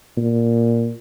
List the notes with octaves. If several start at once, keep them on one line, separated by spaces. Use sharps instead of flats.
A#2